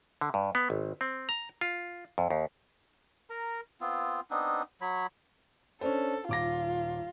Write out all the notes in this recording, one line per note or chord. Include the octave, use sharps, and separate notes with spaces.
D3
G2
B3
G#1
C4
A#5
F4
F2
D#2
A#4 A#5
B3 C4 F4
B3 C4 D4 D#4
F#3 C#5 B5
C#4 D4 A4 C5
D#1 F4 D6 A#6